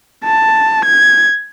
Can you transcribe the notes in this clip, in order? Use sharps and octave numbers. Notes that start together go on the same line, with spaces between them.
A5
G#6